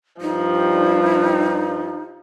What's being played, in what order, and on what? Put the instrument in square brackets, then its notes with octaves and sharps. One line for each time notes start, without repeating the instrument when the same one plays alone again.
[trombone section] G2 G3 [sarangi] F3 [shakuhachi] D#4